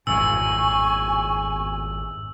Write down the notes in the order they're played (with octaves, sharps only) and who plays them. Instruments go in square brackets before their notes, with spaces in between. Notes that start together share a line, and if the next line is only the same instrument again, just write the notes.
[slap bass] G#1 F2 A2 [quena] G#5 [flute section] C#6 [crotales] E6